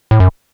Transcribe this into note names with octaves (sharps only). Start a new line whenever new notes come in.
A2
F#2